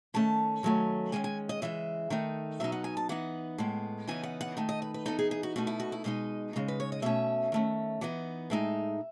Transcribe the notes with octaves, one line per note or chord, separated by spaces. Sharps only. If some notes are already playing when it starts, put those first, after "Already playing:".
D#3 A3 C#4 A5
D#3 F#3 A3 C#4
D#3 G#3 C#4 G#5
G#5
D#5
C#3 E3 G#3 E5
D#3 A3 D#4
B2 F#3 B3 D#4 E5
F#5
G#5
A5
E3 B3 D#4 F#5
A2 G#3 B3
C#3 E3 B3 D#4 G#5
F#5
F#5
D#3 A3 D#4
D#5
B4
B4
E3 B3 D#4 A4
G#4
G#4
F#4
B2 A3 D#4 F#4
E4
F#4
E4
B2 G#3 D#4 D#5
C#3 G#3 D#4
B4
C#5
D#5
B2 A3 C#4 E5
D#3 A3 C#4
E3 B3 D#4 F#5
A2 G#3 D#4 E5